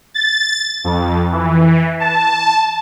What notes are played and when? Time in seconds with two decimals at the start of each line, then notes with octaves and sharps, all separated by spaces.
0.14 A6
0.84 F2
1.32 E3
2.00 A5